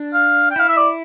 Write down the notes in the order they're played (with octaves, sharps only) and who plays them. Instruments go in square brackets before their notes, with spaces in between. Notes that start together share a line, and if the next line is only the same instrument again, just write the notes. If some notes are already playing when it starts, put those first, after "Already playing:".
Already playing: [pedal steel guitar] D4
[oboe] F5
G5
[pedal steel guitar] E4 [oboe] F5
[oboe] E5
D5